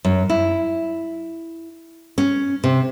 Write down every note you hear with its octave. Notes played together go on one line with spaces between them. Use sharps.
F#2
E4
C#4
C3